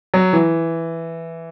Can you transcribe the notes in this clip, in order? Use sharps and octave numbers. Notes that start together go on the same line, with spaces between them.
F#3
E3